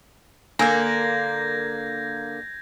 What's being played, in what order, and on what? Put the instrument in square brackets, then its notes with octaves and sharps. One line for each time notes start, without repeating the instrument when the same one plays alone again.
[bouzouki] D3 A#3 [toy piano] D4 A#4 [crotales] G6 G#6 A#6